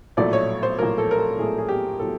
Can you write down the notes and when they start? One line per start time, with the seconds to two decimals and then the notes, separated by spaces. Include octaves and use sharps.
0.17 A#1 A2 F#3 A3 D5
0.33 C#5
0.63 C5
0.78 A#1 A2 F#3 A3 A#4
0.98 A4
1.11 A#4
1.19 A4
1.38 A#1 A2 F#3 A3 G#4
1.58 G#4
1.69 G4
1.99 A2 F#3 A4